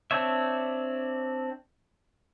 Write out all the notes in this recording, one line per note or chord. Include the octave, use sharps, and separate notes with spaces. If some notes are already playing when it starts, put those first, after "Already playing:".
C4 D4 C#5 E5